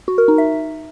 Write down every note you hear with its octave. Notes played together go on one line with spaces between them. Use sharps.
F#4
A#4
D#4
E5